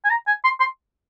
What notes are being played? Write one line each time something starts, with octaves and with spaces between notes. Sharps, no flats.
G#5
A#5
G#5
C6
C6